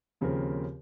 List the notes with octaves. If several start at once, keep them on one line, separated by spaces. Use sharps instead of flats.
D#2 C#3 F3 C4 A#4